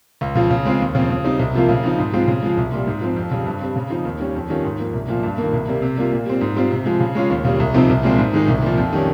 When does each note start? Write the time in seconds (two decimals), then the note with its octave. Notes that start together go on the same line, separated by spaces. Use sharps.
0.21 C#2
0.35 C#3 F3
0.51 C#3
0.65 G#3 C4 F4
0.81 D#2
0.95 C#3 F3 C4 F4
1.10 C#3
1.24 G3 C4 D#4
1.39 C2
1.54 C3 F3 A#3 F4
1.69 C#3
1.83 F3 C4 D#4
1.98 G#2
2.13 F3 G#3 C4 F4
2.28 C#3
2.43 F3 G#3
2.57 C2
2.72 A#2 G3
2.87 G#2
3.01 F3 C4
3.16 F2
3.31 C#3 G3
3.46 G2
3.61 G3 C4
3.76 C#3
3.90 F3 C4 D#4
4.05 D#2
4.20 D#3 G3 C#4
4.35 F2
4.49 D#3 G3 C#4 F4
4.64 G#2
4.79 F3 A#3
4.93 C2
5.08 A#2 F3 A#3
5.23 G2
5.38 D#3 A#3
5.53 C2
5.68 C3 G3 A#3
5.82 C3
5.97 G3 A#3 F4
6.12 A#2
6.26 G3 C4
6.41 G#2
6.56 G3 C4 F4
6.71 C3
6.86 F3 G#3
7.00 C#3
7.15 G#3 C#4 F4
7.30 D#2
7.45 C#3 G3
7.60 C2
7.74 C3 F3 C4 D#4
7.89 C2
8.03 A#2 F3 G#3 C4
8.18 G#2
8.33 D#3 G#3 D#4
8.48 C2
8.62 A#2 F3
8.78 F2
8.93 D#3 G3 C#4